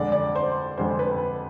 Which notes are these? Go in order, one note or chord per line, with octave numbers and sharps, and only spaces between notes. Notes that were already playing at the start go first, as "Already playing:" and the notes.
Already playing: F2 D3 G#3 D5
D5
C5
F2 D3 G#3 C5
B4